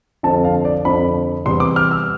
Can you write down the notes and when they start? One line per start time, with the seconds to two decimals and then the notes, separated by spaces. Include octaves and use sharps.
0.23 F2 D3 F3 A5
0.45 F5
0.65 D5
0.85 F2 D3 F3 B5
1.46 E2 C3 G3 C6
1.60 D6
1.76 F6
1.91 E6